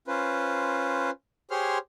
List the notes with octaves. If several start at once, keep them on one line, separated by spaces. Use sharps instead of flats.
C#4 F4 B4 C5
G4 G#4 C5 C#5 C6 F6